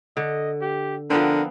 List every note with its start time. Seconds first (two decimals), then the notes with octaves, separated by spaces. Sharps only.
0.17 D3 D#5
0.62 G4
1.10 D3 F3 B3 C4 A#4